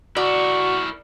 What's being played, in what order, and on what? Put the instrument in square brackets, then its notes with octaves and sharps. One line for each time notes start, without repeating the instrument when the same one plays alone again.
[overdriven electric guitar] E4 A#4 [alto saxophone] F#4 [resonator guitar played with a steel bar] D5 [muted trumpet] C#6